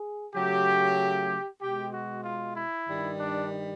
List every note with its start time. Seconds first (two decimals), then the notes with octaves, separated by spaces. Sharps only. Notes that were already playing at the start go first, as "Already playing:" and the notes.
Already playing: G#4
0.34 C#3 F#3 A3 G4
1.61 B2 G#3 G4
1.92 F#4
2.24 F4
2.56 E4
2.88 G2 D#3 G3
3.19 D4